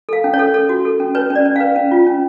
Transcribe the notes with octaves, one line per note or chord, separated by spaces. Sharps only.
A4 F5
C#4
C#5
A4
A4 C#5
F#4
A4
C#4
B4 C#5
C#4
D5
C#4
B4 F5
C#4
F4
C#4